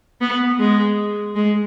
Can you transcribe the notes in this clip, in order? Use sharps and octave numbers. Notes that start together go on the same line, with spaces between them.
B3
G#3
G#3